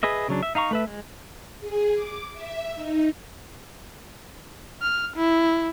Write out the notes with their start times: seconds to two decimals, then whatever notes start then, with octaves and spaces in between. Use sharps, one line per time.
0.03 G#4 B4 D#5 E5
0.28 C#3 F#3 D4
0.43 E5
0.55 D#4 F5 A#5 C#6
0.71 A3 B4 E5
0.87 G#3
1.60 G#4
1.95 D6
2.34 E5
2.75 D#4
4.82 F6
5.16 E4